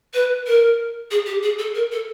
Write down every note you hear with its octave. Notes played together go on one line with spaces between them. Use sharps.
B4
A#4
G#4
G4
G#4
A4
A#4
A4